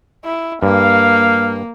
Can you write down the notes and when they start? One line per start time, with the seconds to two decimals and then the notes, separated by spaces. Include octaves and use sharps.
0.25 E4
0.63 G2 A#3 F5